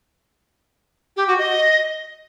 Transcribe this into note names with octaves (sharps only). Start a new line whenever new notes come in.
G4
F#4
D#5